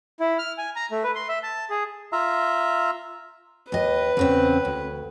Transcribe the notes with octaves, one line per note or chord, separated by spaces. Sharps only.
E4
F6
G#5
A#5
A3
B4
C6
E5
A5
G#4
F4 E5 A#5
D#2 B4 D#5
E2 C#3 C4
D2